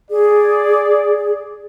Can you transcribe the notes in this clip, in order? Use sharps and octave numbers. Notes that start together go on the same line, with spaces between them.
G#4 D5